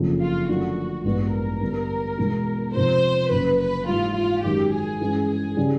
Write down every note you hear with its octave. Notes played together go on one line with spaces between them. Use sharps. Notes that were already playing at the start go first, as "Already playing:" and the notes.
Already playing: F#1 F2 C#3
F4
F#2 D3 F3 A3 D4 F#4
A1 G2 E3 G#3 B3 F#4
A#4
G2 D3 G3 B3
E2 B2 G#3 B3
F2 C3 F3 C5
F#1 F#2 C#3 B4
B4
G#2 E3 G3 F4
F4
F#2 D#3 G#3 G4
G#4
G2 E3 G#3 C#4 G#4
G#4
C#3 E3 G3